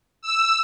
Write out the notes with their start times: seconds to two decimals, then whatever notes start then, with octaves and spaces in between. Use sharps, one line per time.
0.22 E6